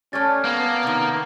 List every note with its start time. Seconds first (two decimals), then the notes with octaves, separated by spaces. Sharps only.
0.13 G3 A3 C#4 F6 G#6 A6
0.45 A#3 B3 G#6
0.83 C3 D#3